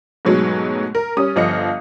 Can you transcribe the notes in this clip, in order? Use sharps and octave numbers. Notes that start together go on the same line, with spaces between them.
G#2 B2 F#3 G#3 A3
A#4
G3 C#4 D#6
G1 F3 D#5 F5 C#7